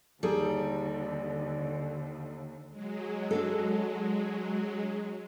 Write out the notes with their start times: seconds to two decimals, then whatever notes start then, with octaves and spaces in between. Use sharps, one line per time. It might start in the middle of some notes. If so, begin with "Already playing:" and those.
0.23 D#2 D3 G3 D#4 G#4 A4
2.70 F#3 G#3
3.31 D4 F#4 A4